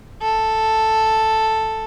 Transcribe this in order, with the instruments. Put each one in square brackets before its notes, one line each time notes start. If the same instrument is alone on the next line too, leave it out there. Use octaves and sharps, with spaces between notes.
[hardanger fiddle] A4